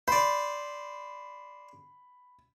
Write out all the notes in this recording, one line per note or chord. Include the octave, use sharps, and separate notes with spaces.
C5 D5 B5